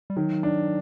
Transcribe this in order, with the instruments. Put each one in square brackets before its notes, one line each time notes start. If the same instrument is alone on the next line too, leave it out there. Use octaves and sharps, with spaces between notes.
[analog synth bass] G3
[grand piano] D#3 [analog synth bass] F#3
[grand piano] D4